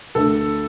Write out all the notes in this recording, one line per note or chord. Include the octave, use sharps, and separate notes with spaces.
D2 D3 A3 D4 A4